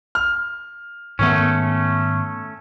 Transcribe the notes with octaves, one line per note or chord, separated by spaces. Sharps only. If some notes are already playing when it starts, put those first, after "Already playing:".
F6
G#2 D#3 A3 B3 C#4